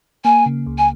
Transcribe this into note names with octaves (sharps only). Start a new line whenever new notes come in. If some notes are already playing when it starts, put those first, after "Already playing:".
A#3 G#5
C#3
C#2
G#5